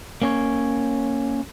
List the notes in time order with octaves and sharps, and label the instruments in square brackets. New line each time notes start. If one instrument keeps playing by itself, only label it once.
[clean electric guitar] A#3 C#4 C#5